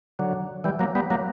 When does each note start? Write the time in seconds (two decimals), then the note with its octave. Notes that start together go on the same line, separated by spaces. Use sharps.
0.19 D3 F#3
0.64 E3 G3
0.79 F#3 A#3
0.95 G3 B3
1.10 F#3 A#3